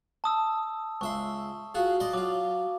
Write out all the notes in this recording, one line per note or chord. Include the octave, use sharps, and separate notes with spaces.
A5 D#6 E6
C#2 E5 C6 C#6
F4 F#4 G#4
D5 D#5 C6
F#3 F4 D6